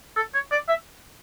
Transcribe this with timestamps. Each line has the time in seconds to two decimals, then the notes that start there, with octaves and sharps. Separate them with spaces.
0.16 A4
0.34 C#5
0.52 D5
0.69 E5